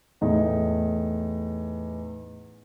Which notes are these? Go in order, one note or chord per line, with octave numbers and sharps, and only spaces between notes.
E2 A2 D#4